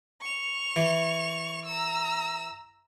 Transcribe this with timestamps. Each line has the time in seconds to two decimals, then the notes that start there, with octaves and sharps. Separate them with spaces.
0.21 C#6 F7
0.76 E3
1.65 A#5 E6